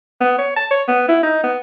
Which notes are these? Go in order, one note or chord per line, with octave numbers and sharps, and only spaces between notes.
B3
C#5
A5
C#5
B3
E4
D#4
B3